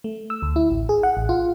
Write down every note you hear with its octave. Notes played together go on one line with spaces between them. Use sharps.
A3
E6
D2
E4
A1
G#4
F#5
A1
F4